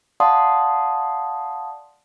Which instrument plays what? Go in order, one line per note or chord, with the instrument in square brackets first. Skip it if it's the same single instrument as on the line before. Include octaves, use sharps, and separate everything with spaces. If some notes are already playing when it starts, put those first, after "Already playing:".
[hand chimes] D5 F5 F#5 A5 C6 D#6